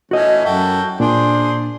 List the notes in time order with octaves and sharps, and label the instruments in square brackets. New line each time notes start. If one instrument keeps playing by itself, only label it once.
[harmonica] E3 A3 C#4 [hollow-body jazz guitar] F#4 D#5
[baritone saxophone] F#2 [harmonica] F#4 A4 G5 [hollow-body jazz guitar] E5
[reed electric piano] A#2 [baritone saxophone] D4 [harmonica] G#4 C5